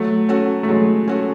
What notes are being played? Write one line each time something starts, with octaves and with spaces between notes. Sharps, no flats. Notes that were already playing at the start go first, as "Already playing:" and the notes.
Already playing: F#3 A3
C#4 F#4 A4
A3
F#3 G#3
C#4 F#4 A4